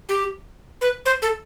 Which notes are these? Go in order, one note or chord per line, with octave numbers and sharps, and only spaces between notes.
G4
B4
C5
A4